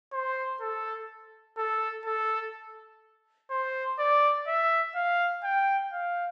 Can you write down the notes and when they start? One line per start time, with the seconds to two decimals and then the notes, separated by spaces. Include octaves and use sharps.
0.13 C5
0.61 A4
1.57 A4
2.05 A4
3.51 C5
3.99 D5
4.47 E5
4.95 F5
5.44 G5
5.92 F5